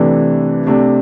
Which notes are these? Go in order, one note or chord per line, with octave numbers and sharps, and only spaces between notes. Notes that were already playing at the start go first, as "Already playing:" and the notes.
Already playing: C3 E3 A3 D4
C3 A3 D4